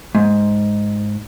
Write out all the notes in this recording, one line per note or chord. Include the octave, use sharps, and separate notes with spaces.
G#2